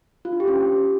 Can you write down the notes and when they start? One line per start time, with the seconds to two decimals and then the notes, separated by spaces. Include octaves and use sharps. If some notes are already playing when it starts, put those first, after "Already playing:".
0.25 F4
0.33 D4
0.40 G4
0.48 C#4